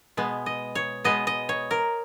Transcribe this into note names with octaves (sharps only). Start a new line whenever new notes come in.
B2 G#3 B3
D#5
C#5
B2 G#3 B3 D#5
D#5
C#5
A#4